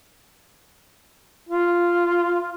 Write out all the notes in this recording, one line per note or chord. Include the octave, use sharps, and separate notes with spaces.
F4